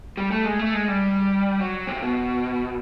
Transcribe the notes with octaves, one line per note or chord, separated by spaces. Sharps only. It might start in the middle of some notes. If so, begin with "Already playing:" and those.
G3
A3
G#3
A3
G#3
G3
F#3
C3
B2